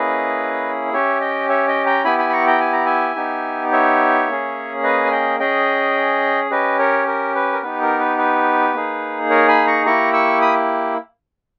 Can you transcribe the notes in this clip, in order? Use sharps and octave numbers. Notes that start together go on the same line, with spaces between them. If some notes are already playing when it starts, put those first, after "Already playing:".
Already playing: A#3 C#4 E4 G#4 B4 D#5
C#4 G4 C#5 E5
D#5 G5
C#5 E5
D#5 G5
G5 A#5
B3 E4 G4 G#5 B5
G#5 B5
B5
A#5 C#6
G5 A#5
G#5
A#5
E5 G#5
B3 D#4 G4
C#5 E5
A#3 C#4 G#4
B4 D#5
G#5
D#5 G5
C#4 G#4 D#5 G5
C#4 G4 B4 D#5
A#4 C#5
A#4
B4
A#4
B3 D#4 G4 B4
A#4
B4
B4
A#3 D#4 G#4
A#4 C#5
G#5 B5
A#5 C#6
A#3 E4 G4 A#5 C#6
C#6 E6
B5 D#6